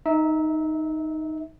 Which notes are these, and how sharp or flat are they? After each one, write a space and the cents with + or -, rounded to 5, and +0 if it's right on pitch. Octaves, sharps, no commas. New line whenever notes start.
D#4 +0 E5 -25